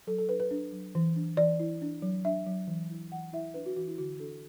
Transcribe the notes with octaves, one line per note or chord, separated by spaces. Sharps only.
F#3 A4
A4
D4 B4
B4
D4
F#3
E3
D4
E3 D5
E4
D4
F#3
D4 E5
F#3
E3
E4
E3 F#5
E4 E5
D4 B4
F#4
E3 F#4
E4
D3 F#4
D4 A4